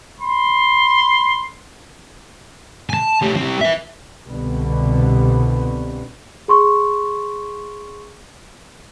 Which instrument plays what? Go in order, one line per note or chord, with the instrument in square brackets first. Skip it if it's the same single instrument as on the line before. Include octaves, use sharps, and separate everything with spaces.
[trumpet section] B5 C6
[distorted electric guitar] G#5 A5
A3 G4
G3 C4
B4 E5
[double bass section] C2 B2 D3 G3 B3
[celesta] G#4 C6 C#6